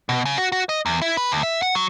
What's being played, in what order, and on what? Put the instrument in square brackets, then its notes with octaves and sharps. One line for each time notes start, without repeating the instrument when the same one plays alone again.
[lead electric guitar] B2
C#3
F#4
F#4
D#5
E2
E4
B4
D2
E5
F#5
F#3